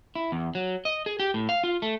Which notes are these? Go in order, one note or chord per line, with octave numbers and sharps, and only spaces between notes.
E4
E2
F#3
D#5
G#4
G4
A2
F5
F4
A3